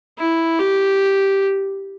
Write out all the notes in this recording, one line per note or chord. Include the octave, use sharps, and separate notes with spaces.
E4
G4